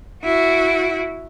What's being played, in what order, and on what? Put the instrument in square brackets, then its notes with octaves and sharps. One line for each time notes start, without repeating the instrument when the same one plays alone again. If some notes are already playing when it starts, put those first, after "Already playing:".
[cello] E4 F#4